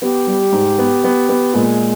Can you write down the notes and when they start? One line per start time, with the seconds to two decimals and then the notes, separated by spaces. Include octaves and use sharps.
0.02 B3 G4
0.27 G3
0.52 G#2
0.78 B3
1.04 B3
1.29 B3
1.54 A#2 G#3